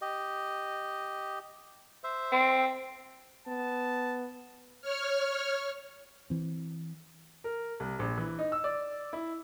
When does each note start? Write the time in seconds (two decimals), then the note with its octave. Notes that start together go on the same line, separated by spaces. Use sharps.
0.02 G4 D#5
2.04 C5 E5
2.32 C4
3.47 B3 A5
4.81 C#5 F6
6.30 E3 C4
7.44 A#4
7.80 C2
7.99 A#1
8.18 E3
8.39 D#4
8.52 E6
8.64 D5
9.13 E4